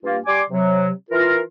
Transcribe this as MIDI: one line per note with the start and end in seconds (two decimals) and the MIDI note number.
0.04 0.18 43
0.04 0.18 58
0.04 0.18 65
0.27 0.42 55
0.27 0.42 74
0.27 0.42 80
0.27 0.42 84
0.27 0.42 86
0.51 0.90 48
0.51 0.90 54
1.11 1.39 52
1.11 1.39 65
1.11 1.39 70